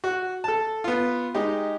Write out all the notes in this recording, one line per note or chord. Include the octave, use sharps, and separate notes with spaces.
F#4 F#5
A4 A5
B3 F4
G#3 D#4 G4